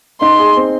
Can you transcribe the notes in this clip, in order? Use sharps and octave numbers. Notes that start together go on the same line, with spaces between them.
D#4 C6
G#4
C4